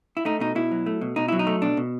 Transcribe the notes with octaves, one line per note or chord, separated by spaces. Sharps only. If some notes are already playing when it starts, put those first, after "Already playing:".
E4
A3 D#4
B2 D#4
B2 E4
F#3
A3
B2
B2 D#4
F#3 E4
D#4
A3
B2 D4
B2